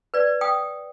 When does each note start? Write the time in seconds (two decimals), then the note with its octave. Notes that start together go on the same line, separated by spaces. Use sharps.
0.14 B4 D5
0.41 G5 D#6